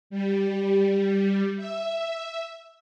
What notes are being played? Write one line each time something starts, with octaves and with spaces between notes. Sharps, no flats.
G3
E5